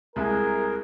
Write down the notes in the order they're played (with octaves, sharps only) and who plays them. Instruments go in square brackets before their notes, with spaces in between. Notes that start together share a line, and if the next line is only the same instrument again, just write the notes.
[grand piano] C2 G#3 E5 [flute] G#4 [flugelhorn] A#4